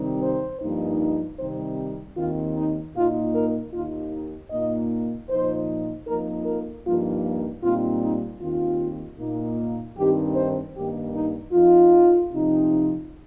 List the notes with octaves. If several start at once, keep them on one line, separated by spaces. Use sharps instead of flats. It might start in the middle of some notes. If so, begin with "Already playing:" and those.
Already playing: C3 D#3 G3 C4 D#4
C5
G2 F3 A#3 D#4
C3 D#3 G3 C4 D#4 C5
D#2 D#3 C4 F4
D#4
A#2 A#3 D#4 F4
A#4
D#2 D#3 A#3 D#4 F4
D#4
A#2 A#3 D#4 D#5
A#2 F3 D#4 C5
F2 F3 A#3 D#4 A#4
A#4
G2 F3 A#3 D#4 F4
A#2 G3 C4 D#4 F4
D#4
D#2 D#3 C4 D#4 F4
A#2 A#3 D#4
G2 D#3 C4 D#4 G4
C5
G2 D#3 A#3 D#4 G4
D#4
F2 F3 D#4 F4
C3 F3 C4 D#4